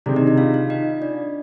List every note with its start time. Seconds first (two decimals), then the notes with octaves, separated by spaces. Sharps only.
0.06 C3 D#3 G#3 C4 D4 D5
0.16 D#4 D#5
0.27 D#4 D#5
0.38 F4 F5
0.54 F4 F5
0.70 D#4 D#5
1.02 D4 D5